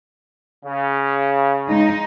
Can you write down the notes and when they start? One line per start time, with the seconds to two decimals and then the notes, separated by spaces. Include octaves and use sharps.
0.66 C#3
1.69 G#3 D#4